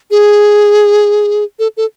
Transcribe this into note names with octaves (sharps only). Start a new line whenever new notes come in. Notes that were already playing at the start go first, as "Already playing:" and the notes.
G#4
A4
A4